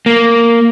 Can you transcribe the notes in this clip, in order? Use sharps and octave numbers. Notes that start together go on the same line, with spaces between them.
A#3